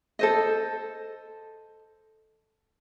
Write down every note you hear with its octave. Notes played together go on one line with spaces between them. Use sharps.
A4 C5 D#5